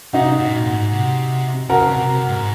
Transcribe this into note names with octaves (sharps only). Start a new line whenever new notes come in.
C3 D#4 F#4
A#2
G#2
C3
C#3 F#4 A#4
C3
C3
G#2